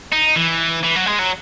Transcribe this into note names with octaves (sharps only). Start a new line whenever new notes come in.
D#4
E3
E3
F#3
G#3
F#3